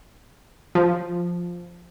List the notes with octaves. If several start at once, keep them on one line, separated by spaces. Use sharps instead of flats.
F3